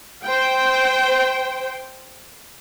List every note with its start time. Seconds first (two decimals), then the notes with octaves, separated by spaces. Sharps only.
0.25 C5 G5